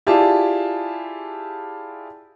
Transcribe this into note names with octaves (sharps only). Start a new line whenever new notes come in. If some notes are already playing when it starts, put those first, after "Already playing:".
E4 F4 G4 G#4 D5 A5